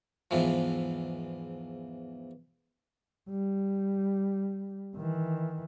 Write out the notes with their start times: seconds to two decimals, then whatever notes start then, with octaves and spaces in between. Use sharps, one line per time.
0.31 E2 G#2 E3 F3
3.29 G3
4.96 D#3 E3